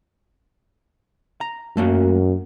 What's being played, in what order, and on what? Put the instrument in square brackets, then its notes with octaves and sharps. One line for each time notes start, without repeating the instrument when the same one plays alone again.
[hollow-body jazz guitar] A#5
[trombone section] F#2 [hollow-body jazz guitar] A3 A#3 F#4